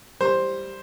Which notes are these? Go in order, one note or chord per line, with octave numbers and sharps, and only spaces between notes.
G3 C5